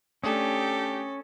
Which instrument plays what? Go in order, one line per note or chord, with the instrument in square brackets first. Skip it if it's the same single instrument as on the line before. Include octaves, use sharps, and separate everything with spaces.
[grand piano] A3 D4 D#6 [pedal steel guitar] C#4 [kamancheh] G4 [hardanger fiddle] A4